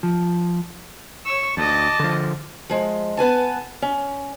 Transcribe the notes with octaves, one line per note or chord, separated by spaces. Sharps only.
F3
C#5 C#6 E6
D2 D#5 A5 D6
D3 F3
F3 G#3
B3 B4 G#5 A5
C#4